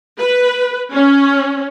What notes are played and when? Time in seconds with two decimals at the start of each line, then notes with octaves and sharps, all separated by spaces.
0.19 B4
0.92 C#4